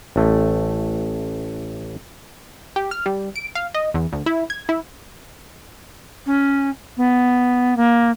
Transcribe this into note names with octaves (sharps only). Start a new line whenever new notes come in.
A1 A3
G4
F6
G3
D7
F5
D#5
E2
D2
E4
G#6
E4
C#4
B3
A#3